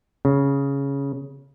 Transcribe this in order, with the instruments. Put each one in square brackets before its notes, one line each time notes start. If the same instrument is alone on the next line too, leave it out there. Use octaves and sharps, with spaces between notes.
[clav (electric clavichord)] C#3